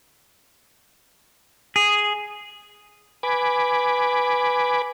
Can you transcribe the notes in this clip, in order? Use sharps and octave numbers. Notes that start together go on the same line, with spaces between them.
G#4
B4 G#5 B5 D6